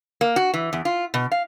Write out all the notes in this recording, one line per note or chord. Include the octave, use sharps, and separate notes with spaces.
A#3
F#4
E3
E2
F4
B2
F5